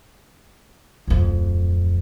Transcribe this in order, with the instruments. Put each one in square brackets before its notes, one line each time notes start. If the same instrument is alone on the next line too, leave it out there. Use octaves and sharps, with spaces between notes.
[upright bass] D1 F2